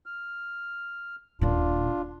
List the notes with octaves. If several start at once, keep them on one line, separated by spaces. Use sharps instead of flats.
F6
D#1 A#2 D4 F4